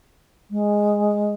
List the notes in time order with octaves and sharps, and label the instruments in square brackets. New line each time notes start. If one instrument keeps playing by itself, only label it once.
[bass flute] G#3